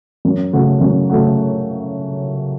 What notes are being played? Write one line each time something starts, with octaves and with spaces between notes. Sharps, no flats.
F#2
C#3 A3 F#4
F#2
C#3 A3 F#4